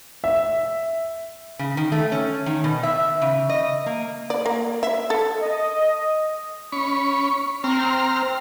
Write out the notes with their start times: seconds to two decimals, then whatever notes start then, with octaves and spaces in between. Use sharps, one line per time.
0.24 E5
1.59 C#3
1.77 D#3
1.92 A3
2.12 C#4
2.46 D#3
2.64 B2
2.83 E5
3.22 C#3
3.49 D#5
3.86 A#3
4.30 D5
4.46 A#3
4.83 E5
5.10 A4
5.41 D#5
6.72 C#4 B5 C#6
7.64 C4 A#5 C6 F6